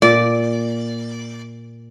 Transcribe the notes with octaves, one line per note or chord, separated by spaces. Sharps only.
A#2 D5